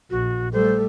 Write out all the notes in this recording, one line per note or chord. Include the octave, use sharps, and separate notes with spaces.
A#1 F#4
G3 A3 A4 C5